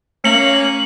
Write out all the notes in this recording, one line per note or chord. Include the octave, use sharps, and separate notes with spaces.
A3 A#3 C#4 A#6 C#7 F#7